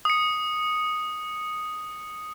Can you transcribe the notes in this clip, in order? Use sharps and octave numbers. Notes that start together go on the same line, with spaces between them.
D#6 C#7